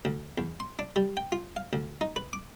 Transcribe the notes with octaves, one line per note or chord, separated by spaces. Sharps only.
D2
E2
C6
D4
G3
G5
F4
F5
D2
D#4
B4
D6